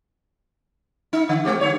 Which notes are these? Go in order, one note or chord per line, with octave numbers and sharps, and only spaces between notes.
D#4
D3
G#3 C4 G4
D3 E3 C#5